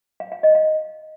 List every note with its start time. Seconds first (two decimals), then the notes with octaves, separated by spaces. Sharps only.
0.20 F5
0.32 F5
0.43 D#5
0.55 F5